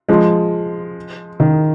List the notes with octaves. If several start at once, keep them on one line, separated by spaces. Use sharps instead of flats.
F3 G#3
D#3